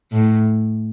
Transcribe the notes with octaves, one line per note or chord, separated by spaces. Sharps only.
A2